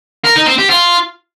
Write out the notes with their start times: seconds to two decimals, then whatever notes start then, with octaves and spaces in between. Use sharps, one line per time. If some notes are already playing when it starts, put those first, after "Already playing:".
0.25 A#4
0.36 D#4
0.47 C4
0.59 G4
0.70 F4